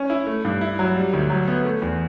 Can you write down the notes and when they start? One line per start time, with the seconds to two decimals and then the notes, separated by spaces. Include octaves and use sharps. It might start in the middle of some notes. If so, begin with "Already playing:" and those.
Already playing: C#4
0.10 E4
0.27 A3
0.45 G2
0.61 E4
0.79 F#3
0.96 G3
1.13 D2
1.30 F#3
1.47 B3
1.65 A3
1.82 E2